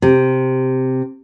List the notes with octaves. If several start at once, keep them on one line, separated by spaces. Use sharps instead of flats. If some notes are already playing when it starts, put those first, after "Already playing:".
C3